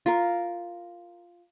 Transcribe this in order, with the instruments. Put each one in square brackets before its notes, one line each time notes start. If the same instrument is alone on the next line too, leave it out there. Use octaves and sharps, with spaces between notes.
[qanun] F4 A#4